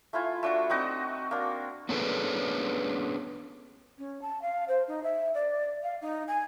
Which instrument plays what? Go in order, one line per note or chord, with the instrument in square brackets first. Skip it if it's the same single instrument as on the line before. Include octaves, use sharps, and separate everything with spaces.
[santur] A3 E4 F4 G#5
A3 D4 F#4
C4 D#4 F#4 D#5
A#3 D4
[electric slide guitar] B3 C#4 D4 G#4 A4 B4
[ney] C#4
A5
F5
C5
D#4
E5
D5
F5
D#4
G#5